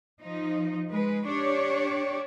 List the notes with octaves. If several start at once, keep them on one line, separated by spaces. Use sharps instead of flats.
F3 D#4
G#3 B4
D4 G4 C#5 D5